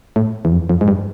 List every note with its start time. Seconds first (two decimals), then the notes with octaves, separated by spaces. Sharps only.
0.16 A2
0.45 E2
0.52 F2
0.70 F2
0.81 G#2
0.88 G2